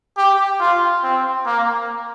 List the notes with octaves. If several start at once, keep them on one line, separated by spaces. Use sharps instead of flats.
G4
F4
C4
A#3